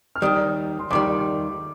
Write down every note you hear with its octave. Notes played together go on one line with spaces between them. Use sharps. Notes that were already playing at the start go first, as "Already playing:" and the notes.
F6
D#2 D#3 G3 D#6
C6
D#2 D#3 G3 D6